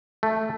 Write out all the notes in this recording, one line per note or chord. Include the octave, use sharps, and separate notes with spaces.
A3